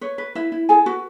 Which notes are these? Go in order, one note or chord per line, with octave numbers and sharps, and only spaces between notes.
B4 C#5
B4
E4 B4 E5
E4
G#4 A4 G#5
F#4 B4